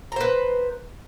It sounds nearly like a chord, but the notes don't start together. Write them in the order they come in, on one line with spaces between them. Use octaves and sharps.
A#5 C5 B4